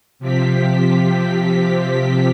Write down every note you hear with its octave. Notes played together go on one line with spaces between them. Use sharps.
C3 F3 C4 G4 B6